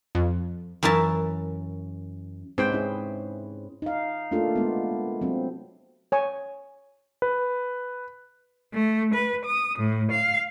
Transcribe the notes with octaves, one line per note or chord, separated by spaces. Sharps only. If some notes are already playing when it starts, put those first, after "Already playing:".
F2
F#2 E3 A#4 E5 A5
G#2 C4 C#4 B4 C5 G5
C#4 E4 G#4
D#4 F5
A3 A#3 D4 F4 A4
G#3 B3
F#3 C4
C#5 G#5 C#6
B4
A3
B4
D#6
A2
F5